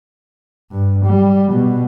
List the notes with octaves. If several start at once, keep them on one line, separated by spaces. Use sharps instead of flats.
G2
G3
B2